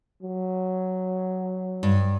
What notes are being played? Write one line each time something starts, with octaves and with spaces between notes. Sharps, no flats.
F#3
G2